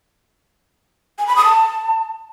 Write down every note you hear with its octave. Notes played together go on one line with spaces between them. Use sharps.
G#5
B5
D#6
A5